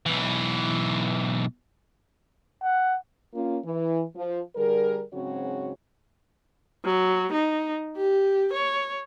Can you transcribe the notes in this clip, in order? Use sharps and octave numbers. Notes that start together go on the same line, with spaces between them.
B1 E3
F#5
A#3 C#4 F4
E3
F3
D3 G3 G#4 A#4
G#2 C#3 F#3 C4 F#4 C#5
F#3
D#4
G4
C#5